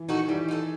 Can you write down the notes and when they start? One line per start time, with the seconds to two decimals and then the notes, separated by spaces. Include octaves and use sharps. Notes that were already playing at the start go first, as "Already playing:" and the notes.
Already playing: E3
0.09 D#3 D#4 F#4 A4
0.28 E3 G3
0.48 D#4 F#4 A4